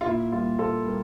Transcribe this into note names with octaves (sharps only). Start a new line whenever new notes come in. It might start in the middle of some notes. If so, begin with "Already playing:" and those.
F4
A#2 E4
G3 A#3 F4
A#2 F4 A4
G3 A#3